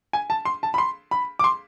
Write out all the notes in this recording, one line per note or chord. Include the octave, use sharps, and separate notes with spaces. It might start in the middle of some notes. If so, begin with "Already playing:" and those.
G#5
A5
C6
A5
B5
C6
B5
D6
C6